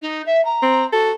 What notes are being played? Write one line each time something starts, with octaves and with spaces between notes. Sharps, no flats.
D#4
E5
A#5
C4
F#4 A4